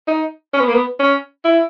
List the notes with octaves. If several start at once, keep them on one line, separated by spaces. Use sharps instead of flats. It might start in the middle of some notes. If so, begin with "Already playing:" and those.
D#4
C#4
B3
A#3
B3
C#4
E4